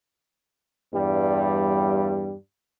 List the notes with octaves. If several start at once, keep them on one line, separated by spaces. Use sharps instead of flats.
E2 G2 G3